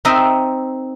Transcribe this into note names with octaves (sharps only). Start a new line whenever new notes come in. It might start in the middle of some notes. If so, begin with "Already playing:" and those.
C4 D#4 A#4 D#5 E5